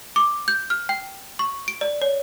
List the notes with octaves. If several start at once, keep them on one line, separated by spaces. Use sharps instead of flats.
D6
G6
F6
G5
C#6
D7
D5
C#5